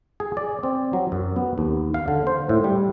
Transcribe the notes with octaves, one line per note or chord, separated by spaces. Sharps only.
G#4
D5
C4
F#3
F#2
B3
D#2
F5
D3
C5
A2
G3